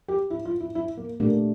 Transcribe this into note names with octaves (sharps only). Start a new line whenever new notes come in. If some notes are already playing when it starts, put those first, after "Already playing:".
G4
E4
F4
E4
E4
A#3
A#2 A3 A#3 D4 G4